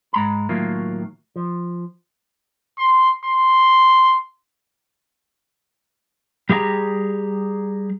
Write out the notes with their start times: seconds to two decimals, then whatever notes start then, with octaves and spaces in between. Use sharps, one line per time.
0.13 G#2 G#3 A#5 B5
0.49 A2 D#3 F#3 A3 A#3 F4
1.36 F3
2.79 C6
3.25 C6
6.49 G3 G4 G#4 E5 A#5